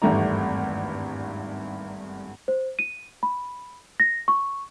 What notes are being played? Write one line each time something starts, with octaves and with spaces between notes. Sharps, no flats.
G#1 E2 G2 A3 D#4 A#5
C5
D#7
B5
A#6
C#6